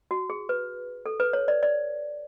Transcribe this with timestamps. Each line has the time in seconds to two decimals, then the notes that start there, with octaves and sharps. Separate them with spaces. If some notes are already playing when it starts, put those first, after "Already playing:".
0.11 F#4
0.30 G#4
0.49 B4
1.06 A4
1.20 B4
1.33 C#5
1.48 D5
1.63 D5